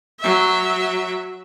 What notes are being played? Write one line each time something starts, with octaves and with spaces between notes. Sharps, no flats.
F#3 E5